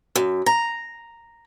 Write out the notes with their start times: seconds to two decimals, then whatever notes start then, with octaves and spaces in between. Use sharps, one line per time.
0.16 F#2
0.46 A#5